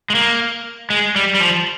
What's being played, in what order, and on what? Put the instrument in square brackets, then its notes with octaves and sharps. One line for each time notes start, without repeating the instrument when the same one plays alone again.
[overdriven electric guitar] G#3
A#3
G#3
G3
G3
F3